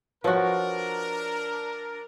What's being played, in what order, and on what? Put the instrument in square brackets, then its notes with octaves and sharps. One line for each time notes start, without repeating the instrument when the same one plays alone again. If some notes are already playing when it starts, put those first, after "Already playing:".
[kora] F3 F#4 [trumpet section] D4 A#4 [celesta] B4 C#5 F#6